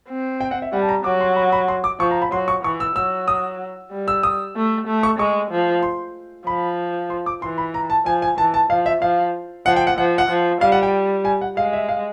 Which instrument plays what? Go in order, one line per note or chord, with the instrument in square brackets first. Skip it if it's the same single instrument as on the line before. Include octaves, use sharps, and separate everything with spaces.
[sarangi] C4
[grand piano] G5
F#5
E5
[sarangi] G3 [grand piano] F#5
[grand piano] A5
A#5
[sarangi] F#3 [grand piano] D6
[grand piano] C6
B5
B5
C6
D6
[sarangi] F3 [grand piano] C#6
[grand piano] A#5
B5
[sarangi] F#3 [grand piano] C6
[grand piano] C#6
[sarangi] E3 [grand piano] C#6
[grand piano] E6
[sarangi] F#3 [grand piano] E6
[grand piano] D#6
[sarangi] G3
[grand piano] E6
D#6
[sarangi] A3
A3
[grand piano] C#6
[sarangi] G#3 [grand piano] C#6
[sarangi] F3
[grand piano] C6
[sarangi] F3 [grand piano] B5
[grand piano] C6
D6
[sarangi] E3 [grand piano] C6
[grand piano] B5
A#5
A5
[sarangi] F3 [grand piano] G#5
[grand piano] G#5
[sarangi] E3 [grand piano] A5
[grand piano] A5
[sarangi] F3 [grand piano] F5
[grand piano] E5
[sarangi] F3 [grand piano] F5
[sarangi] F3 [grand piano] F#5
[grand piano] G5
F#5
[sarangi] F3 [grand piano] F#5
[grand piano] F#5
[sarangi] F3
[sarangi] G3 [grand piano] F5
[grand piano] F#5
G5
G#5
F#5
[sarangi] G#3 [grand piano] F5
[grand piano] E5
F5